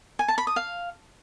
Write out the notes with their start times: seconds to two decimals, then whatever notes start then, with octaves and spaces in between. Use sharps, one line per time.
0.19 G#5
0.28 A5
0.38 B5
0.47 D#6
0.56 F5